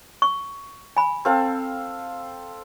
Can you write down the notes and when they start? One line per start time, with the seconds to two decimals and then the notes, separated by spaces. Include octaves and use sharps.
0.22 C#6
0.97 G#5 B5
1.25 C4 A4 F5